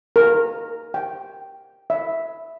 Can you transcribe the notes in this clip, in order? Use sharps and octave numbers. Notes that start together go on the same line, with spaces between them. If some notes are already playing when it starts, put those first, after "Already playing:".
A#4
G5
E5